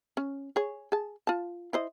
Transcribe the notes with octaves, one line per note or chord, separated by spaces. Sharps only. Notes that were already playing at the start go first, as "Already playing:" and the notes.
C#4
G#4 C#5
G#4 A5
F4 A5
E4 C5 D#5